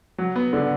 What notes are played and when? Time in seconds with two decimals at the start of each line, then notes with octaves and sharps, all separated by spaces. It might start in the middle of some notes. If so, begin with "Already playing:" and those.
0.18 F#3
0.36 B3
0.53 D3